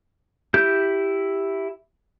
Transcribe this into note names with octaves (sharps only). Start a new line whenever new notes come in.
E4 G4 G6